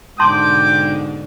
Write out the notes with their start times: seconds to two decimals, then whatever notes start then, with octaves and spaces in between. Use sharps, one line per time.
0.20 G#2 B2 D3 G5 A5 C6 D6